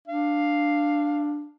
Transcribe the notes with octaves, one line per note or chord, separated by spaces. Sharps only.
D4 F5